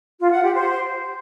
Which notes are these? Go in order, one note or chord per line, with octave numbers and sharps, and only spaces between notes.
F4
F#5
G4
C5